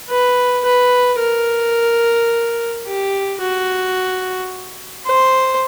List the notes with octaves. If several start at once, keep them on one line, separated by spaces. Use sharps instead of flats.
B4
B4
A#4
G4
F#4
C5